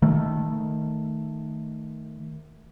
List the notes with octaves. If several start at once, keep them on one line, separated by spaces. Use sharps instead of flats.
D#3 A3